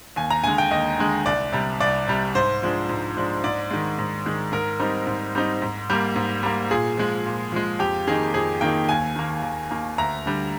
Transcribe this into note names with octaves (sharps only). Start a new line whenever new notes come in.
D#2 G#5
A#5
D3 G#3 G#5
G5
D#2 D#5
D3 G#3
C2 D5
C3 G3
C2 D5
C3 G3
G#2 C5
F3 G#3 D4
G#2
F3 G#3 D4
G#2 D5
D#3 G#3
G#2
D#3 G#3
G#2 A#4
G3 C4 D#4
G#2
G3 C4 D#4
G#2
G3 A#3
G#2
G3 A#3
A#2 G#4
F3 G#3
A#2
F3 G#3
F2 G4
D#3 A#3 D#4 G#4
F2 G#4
D#3 A#3 D#4 G5
D#2 G#5
D#3 A#3
D#2
D#3 A#3
D2 A#5
D3 G3